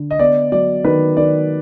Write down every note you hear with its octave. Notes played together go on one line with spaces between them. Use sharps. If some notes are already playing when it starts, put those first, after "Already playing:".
Already playing: D3
D#5
B3 D5
F#3 D5
D#3 B4
D#3 D5